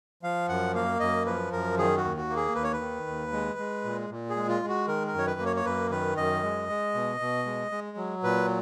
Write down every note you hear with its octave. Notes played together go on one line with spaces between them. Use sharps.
F3 F5
F#2 F#5
A#3 F5
F#2 D#5
F3 B4
F#2 A#4
D#3 G#4
F#4
D#2
F#4
A#3
G#4
D#2 B4
C#5
B4
D#3
D#2
G#3
G#3
A#2
A#2
G#4
G#3
F4
G#3
F#4
D#3 A#4
A#4
F#2 C#5
B4
A#3
C#5
C#5
F#2 B4
D#3 B4
F#2 D#5
G#3
G#3
B2
B2
G#3
G#3
F#3
A#2 B4